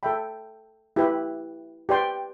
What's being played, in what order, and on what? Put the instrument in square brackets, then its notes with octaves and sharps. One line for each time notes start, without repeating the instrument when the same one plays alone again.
[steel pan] A4 E5 G5 B5
E4 G4 B4
G4 B4 D5 G5 C6